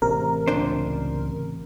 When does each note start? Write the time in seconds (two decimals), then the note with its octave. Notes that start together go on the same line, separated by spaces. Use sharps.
0.02 A1 C3 A#4
0.48 C#2 D4 C5